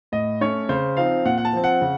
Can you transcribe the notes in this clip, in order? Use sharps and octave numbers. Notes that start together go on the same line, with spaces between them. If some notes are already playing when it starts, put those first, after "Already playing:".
A2 D#5
A3 C#4 C#5
C#3 C5
F3 C4 D#4 F5
A#2 F#5
F#5
A5
F3 C4
F#5
C#3